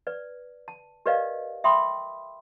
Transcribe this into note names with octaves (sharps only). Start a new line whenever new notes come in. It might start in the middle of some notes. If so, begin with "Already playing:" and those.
B4 D5
A5
G4 A#4 B4 D5 D#5 F5
E5 G5 B5 C6 D#6